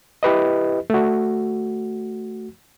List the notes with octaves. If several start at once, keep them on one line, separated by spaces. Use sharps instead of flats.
E4 G4 B4 D#5
A3 F#4